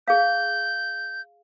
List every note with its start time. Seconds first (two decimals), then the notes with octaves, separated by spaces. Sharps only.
0.08 G#4 F5 G6